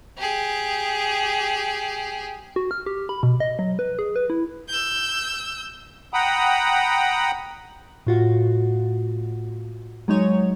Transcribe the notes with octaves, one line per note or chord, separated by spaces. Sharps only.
G4 G#4
F#4
F6
G4
B5
B2
D#5
F#3
B4
G#4
B4
E4
E6 G6
F#5 G5 A#5 B5 D#6
A2 F4 F#4
F#3 G#3 D#4 C#5